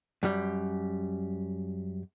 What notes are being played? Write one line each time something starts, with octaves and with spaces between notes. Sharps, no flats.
F#2 G3